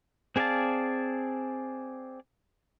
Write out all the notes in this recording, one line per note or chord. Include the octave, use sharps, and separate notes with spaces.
C4 G#4 D5 F5 A5